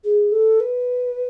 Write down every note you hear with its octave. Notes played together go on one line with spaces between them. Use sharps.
G#4
A4
B4